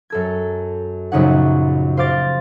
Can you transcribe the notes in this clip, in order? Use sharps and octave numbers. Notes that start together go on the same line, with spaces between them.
F#2 A4 G#6
A#1 F#2 C#3 D#4 C#5 F#5
C5 F5 D6 A6 A#6